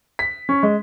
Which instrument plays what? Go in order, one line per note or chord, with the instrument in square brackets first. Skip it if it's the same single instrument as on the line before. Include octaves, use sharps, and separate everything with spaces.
[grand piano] B6
C#4
G#3